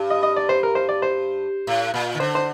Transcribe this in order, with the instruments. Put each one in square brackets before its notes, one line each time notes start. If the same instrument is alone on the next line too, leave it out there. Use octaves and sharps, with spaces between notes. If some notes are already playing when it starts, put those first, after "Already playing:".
Already playing: [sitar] G2
[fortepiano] D#5
D#5
D5
C5
A#4
C5
D5
C5
[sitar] A2
A#2
D#3
[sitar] D3 [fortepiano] C5
[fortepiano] C5